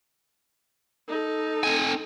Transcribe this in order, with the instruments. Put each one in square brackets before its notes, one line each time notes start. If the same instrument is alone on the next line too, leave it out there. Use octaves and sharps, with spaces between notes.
[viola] D#4 A4
[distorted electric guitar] C4 G#5